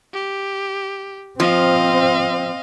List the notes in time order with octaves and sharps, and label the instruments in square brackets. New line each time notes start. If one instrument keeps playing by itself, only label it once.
[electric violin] G4
[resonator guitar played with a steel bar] F3 [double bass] C4 [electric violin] D#5 F5